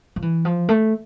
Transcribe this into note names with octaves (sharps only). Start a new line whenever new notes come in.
F3
E3
F3
A3